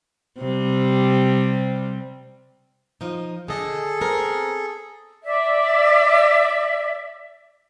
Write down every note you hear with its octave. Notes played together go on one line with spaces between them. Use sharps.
C3 G3
F3 D#4
D3 G#4 A4 D#5
B3 C4 A#4
D5 E5